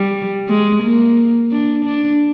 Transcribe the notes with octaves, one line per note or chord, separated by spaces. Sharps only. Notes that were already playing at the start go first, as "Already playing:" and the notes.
Already playing: G3
G#3
A#3
D4
D4